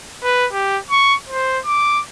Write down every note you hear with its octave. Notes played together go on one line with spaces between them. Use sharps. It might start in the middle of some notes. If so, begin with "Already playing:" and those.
B4
G4
C#6
C5
D6